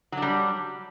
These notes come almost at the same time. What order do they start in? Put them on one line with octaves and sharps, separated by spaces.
F#3 D4 G3